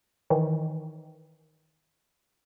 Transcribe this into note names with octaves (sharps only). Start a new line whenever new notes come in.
D#3 E3